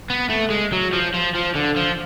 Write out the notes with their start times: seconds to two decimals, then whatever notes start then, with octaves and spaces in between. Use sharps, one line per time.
0.10 B3
0.29 A3
0.50 G#3
0.72 F#3
0.93 F3
1.14 F3
1.35 F3
1.55 D3
1.76 F3